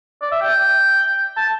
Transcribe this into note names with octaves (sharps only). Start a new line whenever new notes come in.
D5
E5
G5
A5